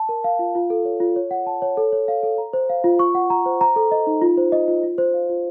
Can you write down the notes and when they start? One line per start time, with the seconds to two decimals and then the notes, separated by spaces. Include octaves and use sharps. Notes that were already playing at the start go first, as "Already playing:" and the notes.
Already playing: A5
0.09 A#4
0.24 F5
0.39 F4
0.55 F4
0.70 A4
0.85 C#5
1.00 F4
1.16 C#5
1.31 F#5
1.46 A5
1.62 C#5
1.77 A4
1.92 C#5
2.08 F5
2.23 A4
2.38 A#5
2.53 C5
2.70 F5
2.84 F4
2.99 C#6
3.15 F#5
3.30 A#5
3.46 C5
3.61 A#5
3.76 A4
3.91 D#5
4.07 D#4
4.22 F4
4.38 C5
4.52 D#5
4.68 F4
4.83 F4
4.98 C5
5.14 F5
5.29 F4